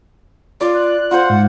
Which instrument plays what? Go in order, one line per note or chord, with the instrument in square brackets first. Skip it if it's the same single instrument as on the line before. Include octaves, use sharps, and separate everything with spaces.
[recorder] F4 [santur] D5
[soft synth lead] F#6
[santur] F4 C5 [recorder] F#5
[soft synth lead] G#2